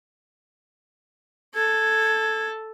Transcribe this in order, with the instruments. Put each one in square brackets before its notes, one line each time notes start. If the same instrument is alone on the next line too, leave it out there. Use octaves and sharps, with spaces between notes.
[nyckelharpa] A4 [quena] G#6